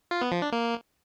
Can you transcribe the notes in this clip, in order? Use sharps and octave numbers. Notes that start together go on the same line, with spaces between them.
F4
B3
F3
D4
A#3